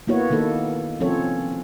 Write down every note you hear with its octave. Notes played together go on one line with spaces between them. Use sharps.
A#3 B3 E4 F#4 C#5
D#3 A#3 D#4 A4
F3 C4 C#4 A4 C#5